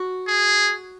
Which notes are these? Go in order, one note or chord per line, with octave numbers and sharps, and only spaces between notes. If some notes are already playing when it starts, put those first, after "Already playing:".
Already playing: F#4
G#4